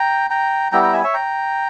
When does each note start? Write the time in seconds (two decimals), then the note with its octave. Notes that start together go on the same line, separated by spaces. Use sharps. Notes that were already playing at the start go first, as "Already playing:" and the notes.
Already playing: G5 A#5
0.30 G5 A#5
0.72 G3 B3 E4 G5 A#5
0.82 G5 A#5
0.93 E5 G#5
1.04 C#5 E5
1.14 G5 A#5